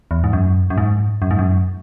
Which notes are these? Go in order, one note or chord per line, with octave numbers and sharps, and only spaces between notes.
E2
G#2
F#2
F#2
G#2
F#2
G#2
F#2